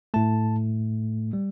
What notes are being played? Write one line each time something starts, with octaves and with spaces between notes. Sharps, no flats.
A2 A3 A5
G3